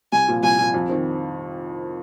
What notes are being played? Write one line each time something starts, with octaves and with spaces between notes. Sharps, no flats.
C2 G#5
A#2 F3
C2 G#5
A#2 F3
F2
D#3 C4